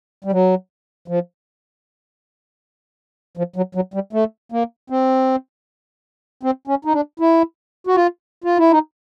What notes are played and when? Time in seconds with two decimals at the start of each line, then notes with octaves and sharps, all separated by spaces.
0.24 G3
0.32 F#3
1.08 F3
3.37 F3
3.56 F#3
3.75 F#3
3.94 G3
4.13 A3
4.52 A#3
4.90 C4
6.43 C4
6.67 C#4
6.85 D#4
6.94 D4
7.20 E4
7.87 F#4
7.96 F4
8.44 F4
8.58 E4
8.71 D#4